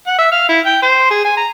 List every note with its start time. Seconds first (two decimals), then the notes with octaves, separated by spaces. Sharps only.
0.07 F#5
0.18 E5
0.32 F5
0.49 E4
0.66 G5
0.82 C5
1.11 G#4
1.25 G#5
1.37 A#5